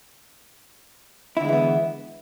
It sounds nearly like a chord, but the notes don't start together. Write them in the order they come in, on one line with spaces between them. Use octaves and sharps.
E4 D3 G#3 E3 B3